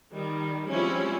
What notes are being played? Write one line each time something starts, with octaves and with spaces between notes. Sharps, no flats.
D#3 G3
F3 G3 G#3 C4 C#4 E4